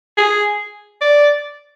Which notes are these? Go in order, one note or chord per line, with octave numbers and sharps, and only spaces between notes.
G#4
D5